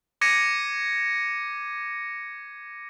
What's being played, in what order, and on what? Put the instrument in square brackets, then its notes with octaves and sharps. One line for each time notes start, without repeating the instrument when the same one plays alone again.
[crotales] D6 G#6 A#6 C#7 D#7